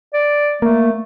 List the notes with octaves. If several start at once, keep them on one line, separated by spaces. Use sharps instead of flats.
D5
A3 A#3